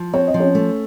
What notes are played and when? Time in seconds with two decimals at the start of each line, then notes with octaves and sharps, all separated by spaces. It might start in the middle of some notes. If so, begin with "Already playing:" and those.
Already playing: F3
0.13 C4 C#5
0.27 D#5
0.34 F3
0.40 C#4 C#5
0.55 A3